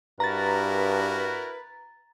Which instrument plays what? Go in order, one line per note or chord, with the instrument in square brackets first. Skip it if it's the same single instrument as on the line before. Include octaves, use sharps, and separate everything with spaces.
[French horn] G2 [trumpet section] E4 F#4 A#4 [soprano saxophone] B4 [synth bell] A#5 A6